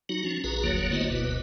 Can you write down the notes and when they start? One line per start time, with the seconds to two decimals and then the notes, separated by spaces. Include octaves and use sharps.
0.09 F#3 D#4 F#4
0.25 F3 C#4
0.44 A#1 F#4 G#4 B4 A#5
0.64 F#1 D#2 D3 F#3 A#3 C#5
0.92 A3 B3 E4 F#4 C5 D#5
1.10 F#1 D2 B2 B4